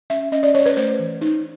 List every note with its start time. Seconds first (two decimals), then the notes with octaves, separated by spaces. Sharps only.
0.10 C#4 E5
0.32 C#4 D#5
0.43 D5
0.55 C#4 C#5
0.66 B4
0.77 A3 C5
0.99 E3
1.21 D#4